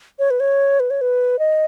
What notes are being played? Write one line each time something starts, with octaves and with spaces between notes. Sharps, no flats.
C#5
B4
C#5
B4
C#5
B4
D#5